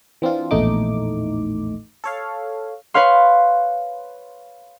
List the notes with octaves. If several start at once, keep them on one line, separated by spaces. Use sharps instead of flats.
E3 C4 D4 F4
A#1 E2 A2 A3 D#4 D6
A4 C#5 F5
B4 C#5 F5 C6